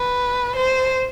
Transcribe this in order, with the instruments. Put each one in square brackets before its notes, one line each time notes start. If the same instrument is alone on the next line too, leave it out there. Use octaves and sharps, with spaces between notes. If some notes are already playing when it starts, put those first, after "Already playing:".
Already playing: [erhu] B4
C5